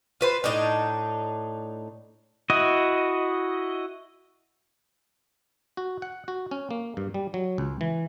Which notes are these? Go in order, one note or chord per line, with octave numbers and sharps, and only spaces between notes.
F4 B4 C5
A2 D4 D#4 A#5
E4 F#4 D#5
F#4
F#5
F#4
C#4
A#3
G2
G3
F#3
C#2
E3